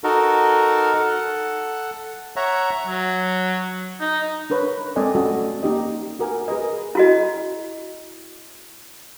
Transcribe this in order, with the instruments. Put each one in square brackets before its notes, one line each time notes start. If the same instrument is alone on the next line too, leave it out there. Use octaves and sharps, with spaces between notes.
[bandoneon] D#4 F#4 A4 A#4
A4 F#5
C#5 E5 F#5 A#5
[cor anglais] F#3
D#4
[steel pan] D4 A#4 B4 C#5
G#3 C4 A4 D5 D#5 G#5
A3 C#4 F#4 A4 D#5
A#3 D#4 G4 D#5
F#4 A#4 G#5
G#4 A#4 B4 D#5
[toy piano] E4 F#4 D#5